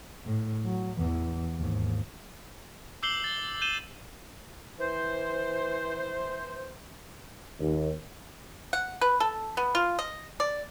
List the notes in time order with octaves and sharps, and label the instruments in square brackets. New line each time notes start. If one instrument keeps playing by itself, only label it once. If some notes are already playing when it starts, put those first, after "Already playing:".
[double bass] A2
F#3
E2 E3
D#2 G#2
[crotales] D6 E6 G6 C7 F#7 G7
A6
G6 D#7 E7 G7
[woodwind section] E3 C5
[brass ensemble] D#2
[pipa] F#5
B4
A4
B3
F4
D#5
D5